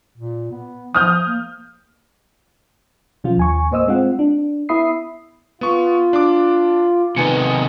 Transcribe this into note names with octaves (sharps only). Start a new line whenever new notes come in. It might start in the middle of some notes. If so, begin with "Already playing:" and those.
A#2
B3
F3 D#6 F6 G6
A#3
B2 F3 C#4 F4
D#2 G#5 C#6
A2 A#3 C5 D#5 D#6 E6
G#3 C4 F4 F#5
D4
B3 E4 E5 B5 D#6 C7
B3 F4 C#6
D4 D6
C3 D#3 B3 D#4 G#5 C#7